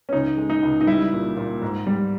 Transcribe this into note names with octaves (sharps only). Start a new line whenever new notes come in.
C#4
C#2 D#4
G#3
D#4
C#2
D#4
G3 E4
A#2
A#2
G#2
G3